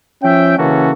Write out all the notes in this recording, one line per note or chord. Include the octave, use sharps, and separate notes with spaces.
F3 C#4 E5 G5
C#3 E3 A#3 C#4 F#4 A4